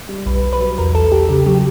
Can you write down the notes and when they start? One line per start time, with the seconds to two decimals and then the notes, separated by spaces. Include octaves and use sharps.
0.09 G3
0.26 B1 B4
0.43 B1
0.53 B4
0.60 F#3
0.78 E2 A#4
0.95 E2 A4
1.12 E2 G4
1.29 C#3 G4
1.46 F#3 G4